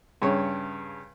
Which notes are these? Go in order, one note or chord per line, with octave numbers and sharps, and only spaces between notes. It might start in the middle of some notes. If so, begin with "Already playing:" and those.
G2 C#3 C#5